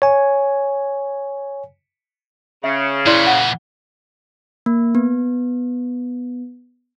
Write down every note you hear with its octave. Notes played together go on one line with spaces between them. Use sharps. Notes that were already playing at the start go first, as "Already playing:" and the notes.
C#5 G#5
C#3 E5
A#2 E3 E4 D5 C6
F#5
A#3
B3